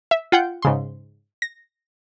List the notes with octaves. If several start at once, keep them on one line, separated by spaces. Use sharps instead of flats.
E5
F4 F#5 G5 G6
G#2 C#3 C6
A#6